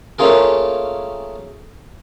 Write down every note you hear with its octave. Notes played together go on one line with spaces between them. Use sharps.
A3 A#3 C#4 F4 G#4 A#4